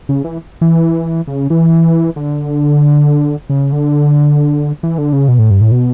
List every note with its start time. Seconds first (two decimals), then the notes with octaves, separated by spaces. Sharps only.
0.09 C#3
0.24 E3
0.61 E3
1.27 C#3
1.50 E3
2.16 D3
3.50 C#3
3.72 D3
4.83 E3
4.98 D3
5.13 C#3
5.28 B2
5.39 A2
5.51 G2
5.61 A2
5.72 B2